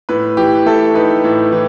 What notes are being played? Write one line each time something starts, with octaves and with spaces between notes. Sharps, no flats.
A2 B4
E3 G4
A3 A4
D#4 B4
A2
E3